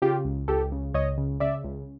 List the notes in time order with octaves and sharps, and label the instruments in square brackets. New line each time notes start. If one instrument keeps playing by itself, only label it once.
[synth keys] C#3 F4 G4
C#2
C#2 G4 A4
C#3
C#2 C#5 D#5
C#3
C#3 D5 E5
C#2